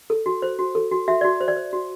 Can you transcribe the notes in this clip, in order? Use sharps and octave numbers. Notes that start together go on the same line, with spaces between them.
A4
F#4
C5
F#4
A4
F#4
F#4 E5
F#4 D5
C5
D5
C5
F#4